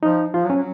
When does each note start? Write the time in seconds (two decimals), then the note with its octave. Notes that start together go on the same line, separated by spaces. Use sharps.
0.03 F3 D#4
0.34 F3 F4
0.44 F#3
0.50 C#4
0.55 F#3